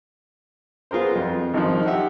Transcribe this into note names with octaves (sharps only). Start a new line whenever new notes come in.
B3 F4 G#4 A#4 C5
F2 F4
G#1 D#3 F3
G4 E5 F#5